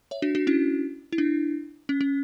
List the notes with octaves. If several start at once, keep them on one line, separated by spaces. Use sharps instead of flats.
C#5 E5
D4 F#4
D4 F#4
C#4 E4
E4
D4
C#4
C#4